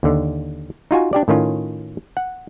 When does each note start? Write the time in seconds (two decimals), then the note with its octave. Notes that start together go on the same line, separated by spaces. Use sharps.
0.03 D#2 D3
0.91 D#4 F4 F#4 G#5
1.13 D4 G4 D5
1.28 A2 D#3 C#4 F4
2.17 F#5